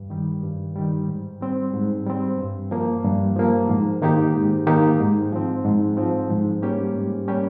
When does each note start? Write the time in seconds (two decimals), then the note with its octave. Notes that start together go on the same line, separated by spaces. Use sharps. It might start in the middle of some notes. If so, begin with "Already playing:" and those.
Already playing: G2
0.10 D#3 G3
0.43 G2
0.76 D#3 G3
1.08 G#2
1.41 G3 C4
1.73 G#2
2.06 G3 C4
2.38 G2
2.71 F3 A#3
3.04 G2
3.36 F3 A#3
3.69 G#2
4.02 D#3 A#3 D#4 G4
4.35 G#2
4.67 D#3 A#3 D#4 G4
5.00 G#2
5.32 F3 C4
5.65 G#2
5.97 F3 C4
6.30 G#2
6.63 G3 A#3 C#4 G4
6.95 G#2
7.28 G3 A#3 C#4 G4